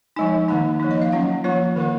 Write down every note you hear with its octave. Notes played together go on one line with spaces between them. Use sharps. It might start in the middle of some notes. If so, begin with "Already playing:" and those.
F3 G#3 D#4 G#5
D#3 A#3 D#4 A#5
F3 A#3 D#4
D#5
F5
F#3 C#4 F4 F#5
F3 A#3 F4 C#5
D#3 A#3 F4 A#4